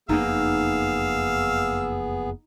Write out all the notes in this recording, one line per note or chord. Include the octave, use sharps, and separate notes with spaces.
F#1 F2 A#3 B3 D#4 G#4 F5 E6